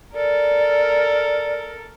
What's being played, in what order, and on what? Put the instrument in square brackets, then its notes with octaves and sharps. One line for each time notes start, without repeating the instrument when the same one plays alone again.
[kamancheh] A4 A#4 [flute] D5